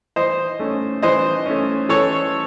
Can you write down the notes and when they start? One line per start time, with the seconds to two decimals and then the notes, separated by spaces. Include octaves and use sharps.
0.16 E3 C5 D#5
0.60 A3 C#4
1.02 E3 C5 D#5
1.46 A3 C#4
1.89 E3 A4 C#5